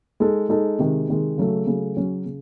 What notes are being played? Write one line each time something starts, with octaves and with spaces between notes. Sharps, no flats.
G#3 D#4 A4
G#3 D#4 A4
C3 D#3 G#3
C3 D#3 G#3
C#3 F#3 A3
C#3 F#3 A3
C#3 F#3 C#4
C#3